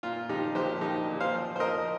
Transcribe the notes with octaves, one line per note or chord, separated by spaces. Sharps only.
A#2 F4
F3 D#4 G4
A#1 G4 C5
A#1 D#4 G4
A#2
C5 F5
F3
C5
A#1 A#4 D#5